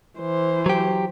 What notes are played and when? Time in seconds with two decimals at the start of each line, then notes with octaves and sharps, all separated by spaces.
0.20 E3 C5
0.66 F#3 G4